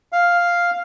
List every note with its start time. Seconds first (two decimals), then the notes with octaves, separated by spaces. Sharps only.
0.12 F5